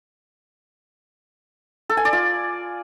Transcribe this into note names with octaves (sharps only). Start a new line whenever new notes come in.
A4
G#5
D5
F4